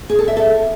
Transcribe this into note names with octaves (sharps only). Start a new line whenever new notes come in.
G#4
A4
E5
A4